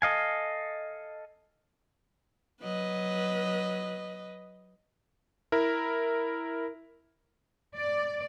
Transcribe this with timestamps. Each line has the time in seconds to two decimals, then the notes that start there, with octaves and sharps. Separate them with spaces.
0.02 A4 D#5 F5 G#5
2.61 F#3 B4 D#5
5.52 E4 A#4
7.76 D5